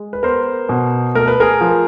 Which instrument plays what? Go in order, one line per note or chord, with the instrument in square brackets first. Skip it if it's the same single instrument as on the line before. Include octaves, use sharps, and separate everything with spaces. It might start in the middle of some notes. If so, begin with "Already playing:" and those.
Already playing: [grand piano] G#3
B4
B3 A#4 C5
B2
A3 A#4
B4
G#4 A#4
F3